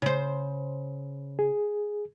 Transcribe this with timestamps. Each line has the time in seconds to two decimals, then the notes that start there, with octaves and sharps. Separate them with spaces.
0.02 C#3 C5
1.39 G#4